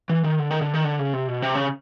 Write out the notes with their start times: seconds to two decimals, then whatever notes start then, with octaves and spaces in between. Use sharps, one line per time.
0.09 E3
0.24 D#3
0.39 D3
0.51 D#3
0.62 D3
0.74 D#3
0.84 D3
0.99 C#3
1.13 C3
1.28 B2
1.42 C3
1.55 C#3